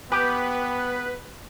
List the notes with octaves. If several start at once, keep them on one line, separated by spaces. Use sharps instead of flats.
B3 G4 B4